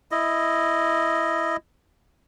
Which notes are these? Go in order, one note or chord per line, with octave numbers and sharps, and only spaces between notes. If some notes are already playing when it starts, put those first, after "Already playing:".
E4 D#5